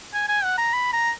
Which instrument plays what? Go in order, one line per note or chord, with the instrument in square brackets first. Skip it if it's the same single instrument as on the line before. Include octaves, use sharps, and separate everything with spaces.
[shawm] G#5
G#5
F#5
A#5
B5
A#5